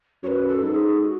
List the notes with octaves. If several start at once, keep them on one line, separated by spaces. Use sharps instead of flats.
F#2 B4 C#5
A4
G#2
G#4
G#4
F#4